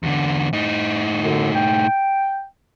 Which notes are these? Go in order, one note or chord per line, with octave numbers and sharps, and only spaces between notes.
E2 D3
A2 D#4
F#2 D3
G5